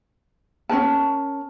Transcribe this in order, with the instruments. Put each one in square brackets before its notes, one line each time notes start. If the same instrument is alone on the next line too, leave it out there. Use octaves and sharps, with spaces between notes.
[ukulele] C#4 D#4 A#4 A5